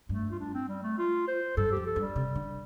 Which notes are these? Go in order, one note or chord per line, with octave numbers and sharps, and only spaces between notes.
G2 A3
F4
D4
C4
G3
A3
F4
C5
G2 A4
G4
F2
A4
G2
G3
C3
D3